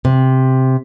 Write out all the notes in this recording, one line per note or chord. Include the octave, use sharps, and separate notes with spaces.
C3